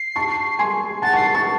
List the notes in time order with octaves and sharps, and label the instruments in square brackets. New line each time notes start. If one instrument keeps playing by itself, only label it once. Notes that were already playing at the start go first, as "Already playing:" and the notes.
Already playing: [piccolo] C7
[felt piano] A5 C#6
G#5 C6
[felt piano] F#5 A5 [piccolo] A6
[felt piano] A5 C#6 [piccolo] C7
[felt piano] A5 C#6 [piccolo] A6